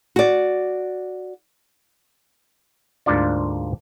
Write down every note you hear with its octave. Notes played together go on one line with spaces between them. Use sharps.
F#4 D5
D2 G#2 A#3 D4 F4 D5